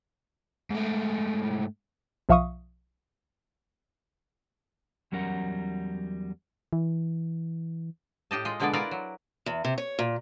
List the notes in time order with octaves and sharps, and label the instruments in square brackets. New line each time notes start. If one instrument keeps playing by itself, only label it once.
[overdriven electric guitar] G#2 A3
[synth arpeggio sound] B1 F3 E5 F5 C#6 D#6
[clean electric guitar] E2 F#3 G3 C#4 A#4 F#5
[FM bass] E3
[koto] A2 G4 D#5 A5
G#3 F4 D#5
B2 D3 G#3 B3 A4 D5
E4 F4 A#4 B4 D5 F5
F#3
[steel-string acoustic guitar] E2
C3
C#5
A#2